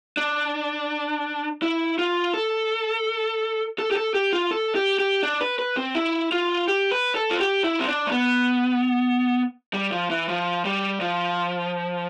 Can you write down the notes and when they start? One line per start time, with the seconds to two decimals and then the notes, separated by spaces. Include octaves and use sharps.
0.17 D4
1.62 E4
1.99 F4
2.34 A4
3.79 A4
3.91 G4
3.96 A4
4.14 G4
4.33 F4
4.51 A4
4.75 G4
4.99 G4
5.23 D4
5.41 B4
5.59 B4
5.77 C4
5.95 E4
6.32 F4
6.68 G4
6.91 B4
7.15 A4
7.31 F4
7.40 G4
7.64 E4
7.80 C4
7.87 D4
8.07 A3
8.11 B3
9.74 G3
9.92 F3
10.10 E3
10.29 F3
10.65 G3
11.01 F3